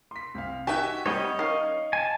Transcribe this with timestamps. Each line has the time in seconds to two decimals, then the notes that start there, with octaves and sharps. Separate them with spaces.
0.11 C6 B6
0.34 C2 F5
0.67 D#4 F#4 G4 E5 G#5
1.06 G3 C4 D#4 C#5 D#5 F#5
1.39 D#3 C#4 F5 C#6 C7
1.93 G#5 A5